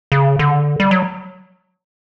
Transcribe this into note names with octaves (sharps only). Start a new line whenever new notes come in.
C#3
D3
G3
F#3